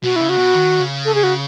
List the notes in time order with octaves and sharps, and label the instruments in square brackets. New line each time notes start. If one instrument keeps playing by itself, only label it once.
[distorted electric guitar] B2 [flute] F#4
[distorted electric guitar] C#3 [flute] E4
[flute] F#4
[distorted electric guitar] B2
D#3
C#3
[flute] A4
G#4
F#4